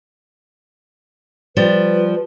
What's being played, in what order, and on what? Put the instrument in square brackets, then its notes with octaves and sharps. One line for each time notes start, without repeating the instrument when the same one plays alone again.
[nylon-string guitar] F3 G3 [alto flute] B4